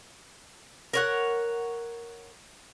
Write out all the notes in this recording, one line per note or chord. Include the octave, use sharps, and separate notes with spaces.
A#4 C#5 F#5